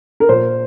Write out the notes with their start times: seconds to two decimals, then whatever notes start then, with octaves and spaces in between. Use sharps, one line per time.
0.20 A#4
0.29 A#2 C5